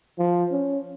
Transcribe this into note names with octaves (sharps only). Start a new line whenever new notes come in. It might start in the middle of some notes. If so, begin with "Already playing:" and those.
F3
C#4